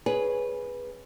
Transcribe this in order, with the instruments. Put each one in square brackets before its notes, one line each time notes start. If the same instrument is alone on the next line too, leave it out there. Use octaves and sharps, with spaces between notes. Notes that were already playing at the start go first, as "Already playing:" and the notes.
[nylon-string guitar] C#4 G#4 B4